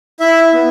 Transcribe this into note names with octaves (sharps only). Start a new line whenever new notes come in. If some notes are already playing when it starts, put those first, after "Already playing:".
E4 E5
B3